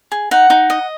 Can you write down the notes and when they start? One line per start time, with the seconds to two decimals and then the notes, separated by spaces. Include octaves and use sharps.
0.12 G#4
0.31 D#4 F#5
0.50 D#4
0.70 D#5